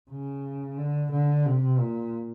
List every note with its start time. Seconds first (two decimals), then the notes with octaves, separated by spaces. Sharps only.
0.11 C#3
0.78 D3
1.11 D3
1.46 C3
1.79 A#2